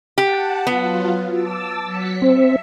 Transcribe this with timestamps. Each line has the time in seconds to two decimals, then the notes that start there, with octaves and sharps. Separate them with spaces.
0.18 G4 F#5 A5
0.67 F#3 B3 F4
1.31 A5 D6 E6
1.85 F#3 B6 C#7
2.22 C4 E5